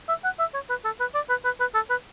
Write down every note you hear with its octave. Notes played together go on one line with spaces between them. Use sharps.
E5
F#5
E5
C#5
B4
A4
B4
D5
B4
B4
B4
A4
B4